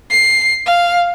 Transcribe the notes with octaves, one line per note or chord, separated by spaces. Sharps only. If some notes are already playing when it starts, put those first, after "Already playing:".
C7
F5